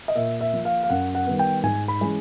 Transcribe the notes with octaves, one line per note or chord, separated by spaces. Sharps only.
D#5
A#2 E5
E5
F3 A#3
F5
F5
F#2 F#5
F#5
D#3 G3 B3
G5
G#2 G#5
B5
E3 G#3 C#4